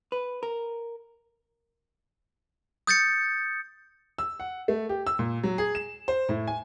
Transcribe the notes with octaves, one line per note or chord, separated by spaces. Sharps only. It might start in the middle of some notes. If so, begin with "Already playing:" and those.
B4
A#4
D#6 G6 A6 C#7
E6
F#5
A3
G4
E6
A#2
F#3
G#4
E7
C5
A2
G#5